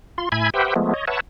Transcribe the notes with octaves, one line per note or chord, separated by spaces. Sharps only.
F4 C6
A2 E5 G#5 B5 G#6
G4 B4 C5 E5 F#5 G5
F3 G#3 A3 B3
C#5 D#5
B4 C#5 E5 F#5 A5